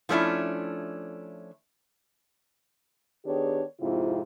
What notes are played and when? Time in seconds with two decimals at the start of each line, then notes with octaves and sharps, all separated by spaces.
0.09 F3 A3 C#4 D4 E4
3.25 D#3 B3 D4 G4 G#4 C#5
3.80 F2 G#2 C3 E4 F4